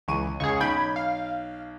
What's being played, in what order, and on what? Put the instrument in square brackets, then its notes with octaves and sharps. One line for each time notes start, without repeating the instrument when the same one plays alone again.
[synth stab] C#2 [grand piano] E3 C#6 D#7
[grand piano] C#2 C#3 [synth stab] G#4 C#6
[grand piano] B1 G6 D7 [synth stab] B5 G#6
[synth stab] F5